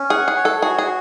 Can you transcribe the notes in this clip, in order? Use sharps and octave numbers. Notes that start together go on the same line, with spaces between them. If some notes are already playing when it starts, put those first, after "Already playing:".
Already playing: C#4
G#4 F#5
G#4
C#5
A4
F#4 G#4
G#4